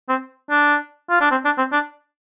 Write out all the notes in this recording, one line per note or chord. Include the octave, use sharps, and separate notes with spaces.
C4
D4
F4
D4
C4
D4
C4
D4